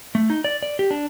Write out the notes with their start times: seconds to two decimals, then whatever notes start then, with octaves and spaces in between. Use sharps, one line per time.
0.15 A3
0.30 D#4
0.44 D5
0.63 D5
0.79 G4
0.91 D4